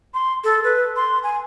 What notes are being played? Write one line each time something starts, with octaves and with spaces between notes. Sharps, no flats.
C6
A4
B4
C6
G#5